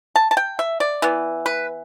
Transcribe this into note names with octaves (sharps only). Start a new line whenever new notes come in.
A5
A5
G5
E5
D5
E3 B3
B4